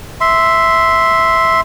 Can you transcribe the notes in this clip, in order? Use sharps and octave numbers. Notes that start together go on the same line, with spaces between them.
E5 C6